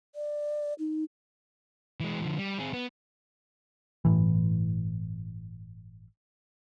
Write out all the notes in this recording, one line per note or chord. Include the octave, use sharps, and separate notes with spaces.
D5
D#4
E3 G#3
D3 F3
G3
C4 G#4
B3
G1 A2 E3